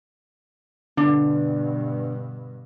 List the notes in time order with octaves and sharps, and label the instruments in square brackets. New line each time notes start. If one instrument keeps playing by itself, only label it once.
[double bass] G2 B2 [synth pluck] D3 [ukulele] D4